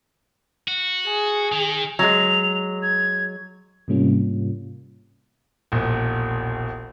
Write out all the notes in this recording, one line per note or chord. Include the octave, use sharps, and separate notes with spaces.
F#4
G#4
D#3
F#3 G#3 F7
G#6
G#2 C3 G3 A#3 C#4 F4
E1 A#1